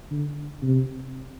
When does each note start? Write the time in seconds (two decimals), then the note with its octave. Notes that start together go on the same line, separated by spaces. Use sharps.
0.11 D3
0.62 C3